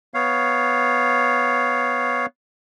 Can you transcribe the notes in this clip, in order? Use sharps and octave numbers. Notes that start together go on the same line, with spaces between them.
B3 C#5 F5